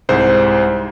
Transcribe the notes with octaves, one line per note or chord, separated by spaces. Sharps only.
C2 G#2 C5